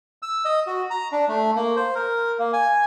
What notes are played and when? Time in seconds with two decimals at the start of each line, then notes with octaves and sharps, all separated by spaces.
0.22 E6
0.45 D#5
0.67 F#4
0.90 A#5
1.12 D4
1.29 A3
1.56 A#3
1.76 C5
1.95 A#4
2.39 A#3
2.53 G#5